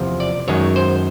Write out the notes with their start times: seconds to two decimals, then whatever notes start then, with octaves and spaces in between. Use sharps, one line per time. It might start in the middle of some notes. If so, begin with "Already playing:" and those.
Already playing: E2 C3 F3
0.20 D5
0.48 F#2 D#3 G#3 C#5
0.76 C5